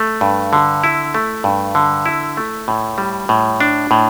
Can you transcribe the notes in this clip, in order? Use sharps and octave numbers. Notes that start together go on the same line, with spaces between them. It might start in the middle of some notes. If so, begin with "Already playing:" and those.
Already playing: A3
G2
D3
E4
A3
G2
D3
E4
A3
A2
G3
A2
D4
A2